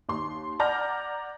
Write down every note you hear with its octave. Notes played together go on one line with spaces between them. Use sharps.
D#2 C6
D5 F#5 A#5 F6 G6 A#6